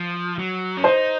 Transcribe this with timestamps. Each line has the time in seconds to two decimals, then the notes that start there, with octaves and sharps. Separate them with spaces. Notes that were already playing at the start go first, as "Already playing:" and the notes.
Already playing: F3
0.39 F#3
0.77 C#4
0.83 D#4 C5